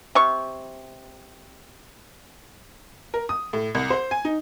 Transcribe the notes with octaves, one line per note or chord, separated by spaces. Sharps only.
C3 C#6
A#4
D#6
A2
C2
C5
G#5
D#4